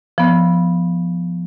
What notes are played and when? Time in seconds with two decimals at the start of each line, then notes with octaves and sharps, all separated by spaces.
0.18 F3 B3